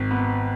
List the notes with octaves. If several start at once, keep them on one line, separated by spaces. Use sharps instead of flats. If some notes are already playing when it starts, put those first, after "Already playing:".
Already playing: G#1
B3